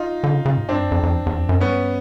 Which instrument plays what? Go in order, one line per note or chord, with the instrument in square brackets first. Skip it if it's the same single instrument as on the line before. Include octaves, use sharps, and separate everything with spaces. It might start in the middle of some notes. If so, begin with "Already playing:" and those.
Already playing: [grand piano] D#4 F4
[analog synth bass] D3
C#3
C#3
G#2
[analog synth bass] G2 [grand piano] C4 D4
[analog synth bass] F#2
F2
F2
E2
E2
F2
F#2
[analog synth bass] G2 [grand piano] B3 C#4